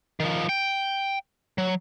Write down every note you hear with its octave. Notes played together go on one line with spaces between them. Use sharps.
D#3 F3
G5
F#3